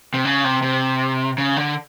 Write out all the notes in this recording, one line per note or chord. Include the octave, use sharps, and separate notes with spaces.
C3
C#3
C3
C3
C#3
D3